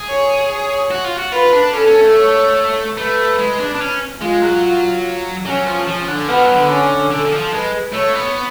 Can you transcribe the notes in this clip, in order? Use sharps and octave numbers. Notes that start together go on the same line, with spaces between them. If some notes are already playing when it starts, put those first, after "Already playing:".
Already playing: G#4
C#5
C#5
F#4
F4
F#4
F4 B4
D4
C#4 A4
C#4
A3
C#5
A3 B4
G#3
D4
D4
C#4
G#3 F4
F#3
F#3 C#4
F3
F3
D3
F3 B3
F#3
D3
C#4
D3 A4
D3
F3
G#3 B4
A3 C#5
B3